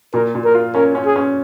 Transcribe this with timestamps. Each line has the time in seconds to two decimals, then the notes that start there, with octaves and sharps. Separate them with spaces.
0.14 A#2 A#4
0.35 A#2
0.45 A#4
0.55 F4
0.75 C#4 A#4
0.95 C#4
1.06 G#4
1.16 C#4